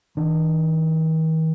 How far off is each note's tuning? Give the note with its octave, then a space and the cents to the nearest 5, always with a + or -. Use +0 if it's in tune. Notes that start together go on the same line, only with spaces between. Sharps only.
D#3 +45 D4 +25